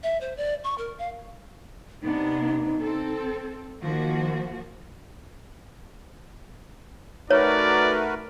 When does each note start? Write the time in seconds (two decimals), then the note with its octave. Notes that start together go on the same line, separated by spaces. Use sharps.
0.03 E5
0.21 C5
0.37 D5
0.64 C#6
0.78 A#4
0.99 F5
2.03 C3 B3 D4 D#4
2.82 C4 A4
3.82 D#3 F3 A#3 F#4
7.30 A3 D#4 F#4 A#4 B4 C#5 D5